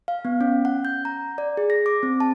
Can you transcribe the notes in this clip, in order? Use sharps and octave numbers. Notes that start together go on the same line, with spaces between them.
F5
B3
C#4
F#5
G6
A#5
D5
G#4
A#6
D6
C4
A5